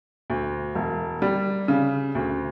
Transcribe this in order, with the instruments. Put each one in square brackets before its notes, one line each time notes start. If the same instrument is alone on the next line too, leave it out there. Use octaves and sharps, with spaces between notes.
[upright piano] D2
E1
G3
C#3
D2